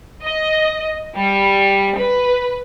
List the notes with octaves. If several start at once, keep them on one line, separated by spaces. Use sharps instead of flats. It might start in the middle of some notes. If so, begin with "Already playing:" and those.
D#5
G3
B4